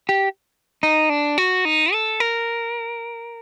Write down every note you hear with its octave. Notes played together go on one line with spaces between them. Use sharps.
G4
D#4
D4
F#4
D#4
A4
A#4